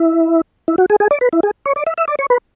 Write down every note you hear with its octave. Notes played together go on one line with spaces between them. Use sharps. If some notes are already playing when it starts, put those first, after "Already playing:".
Already playing: E4
E4
F#4
G#4
G#4
D5
B4
E4
G#4
C#5
D5
E5
E5
D5
C#5
B4